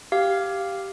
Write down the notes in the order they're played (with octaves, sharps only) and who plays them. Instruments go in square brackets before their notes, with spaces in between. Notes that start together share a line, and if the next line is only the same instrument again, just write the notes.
[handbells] G4 F5